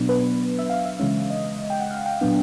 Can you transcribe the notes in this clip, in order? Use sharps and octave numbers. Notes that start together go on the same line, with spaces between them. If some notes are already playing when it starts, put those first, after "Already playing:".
Already playing: B2 F#3 B3 D4
B4
E5
F5
E5
C#3 E3 G#3 C#4
D#5
G5
F#5
F5
G5
A#2 F#3 B3 D4